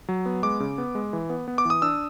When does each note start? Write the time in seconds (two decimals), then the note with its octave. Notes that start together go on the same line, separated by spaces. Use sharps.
0.09 F#3
0.26 B3
0.43 G#3 D6
0.60 C#3
0.78 B3
0.95 G#3
1.13 E3
1.30 B3
1.48 B3
1.58 D6
1.65 E3 D#6
1.82 D4 E6